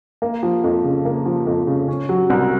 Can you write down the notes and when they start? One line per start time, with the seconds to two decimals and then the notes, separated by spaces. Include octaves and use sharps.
0.22 A#3
0.43 F3
0.64 F2
0.84 C#3
1.05 A#3
1.26 F3
1.47 F2
1.67 C#3
1.88 C#4
2.09 F#3
2.30 C2